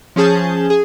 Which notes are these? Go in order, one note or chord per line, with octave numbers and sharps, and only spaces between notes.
F3 C#4 G#4 A5 G6
G#4